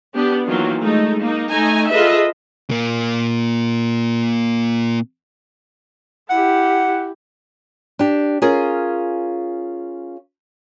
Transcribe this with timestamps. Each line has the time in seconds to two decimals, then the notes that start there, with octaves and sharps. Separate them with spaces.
0.14 B3 D4 G4
0.47 D#3 E3 F#3 A#3 F4
0.81 G#3 A3 D#4
1.21 A#3 D#4
1.50 A3 D#4 G#5 A#5
1.90 F4 G#4 A4 B4 D#5 E5
2.70 A#2 A#3
6.30 E4 G4 F#5
7.99 D4 G4
8.42 C#4 F4 G#4 A#4